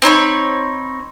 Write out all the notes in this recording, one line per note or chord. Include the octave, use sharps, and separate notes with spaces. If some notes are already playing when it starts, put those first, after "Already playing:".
C4 D#4 C#5 B5